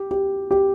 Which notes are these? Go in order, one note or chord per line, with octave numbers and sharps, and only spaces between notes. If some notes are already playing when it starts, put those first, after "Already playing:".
Already playing: G4
G4
G4